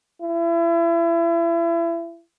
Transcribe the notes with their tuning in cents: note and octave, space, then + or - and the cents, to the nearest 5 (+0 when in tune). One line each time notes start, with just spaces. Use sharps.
E4 +35